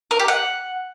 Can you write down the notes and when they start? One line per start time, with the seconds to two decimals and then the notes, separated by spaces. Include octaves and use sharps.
0.11 A#4
0.20 G4
0.28 F#5